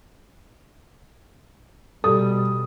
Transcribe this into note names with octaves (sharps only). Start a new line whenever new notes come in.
B2 G3 G4 A4 D#6